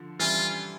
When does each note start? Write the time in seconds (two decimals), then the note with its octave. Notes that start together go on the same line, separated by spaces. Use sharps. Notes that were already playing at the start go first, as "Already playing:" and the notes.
Already playing: D3 F3
0.19 E3 G3 F4